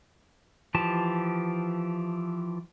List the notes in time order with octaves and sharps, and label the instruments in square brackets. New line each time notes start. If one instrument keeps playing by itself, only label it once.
[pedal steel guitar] E3 F3 G4 A5